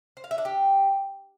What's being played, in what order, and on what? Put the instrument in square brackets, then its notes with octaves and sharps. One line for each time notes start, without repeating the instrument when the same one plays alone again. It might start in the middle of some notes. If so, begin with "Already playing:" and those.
[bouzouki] C5
F5
E5
D4
G4